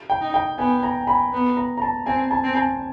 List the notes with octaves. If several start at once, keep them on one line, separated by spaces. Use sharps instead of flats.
G5
D#4
G5
B3 G#5
A#5
B5
B3
A#5
A#5
A5
C4 G#5
A5
C4
A5